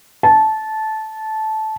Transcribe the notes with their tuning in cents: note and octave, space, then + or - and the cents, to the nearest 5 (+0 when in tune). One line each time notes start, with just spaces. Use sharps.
A5 -15